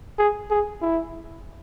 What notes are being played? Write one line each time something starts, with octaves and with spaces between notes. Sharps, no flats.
G#4
G#4
E4